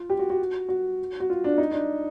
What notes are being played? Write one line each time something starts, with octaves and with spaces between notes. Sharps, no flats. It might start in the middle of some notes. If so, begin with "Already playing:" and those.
Already playing: F4
G4
F#4
F#4
F#4
F#4
F4
D4
D#4
D4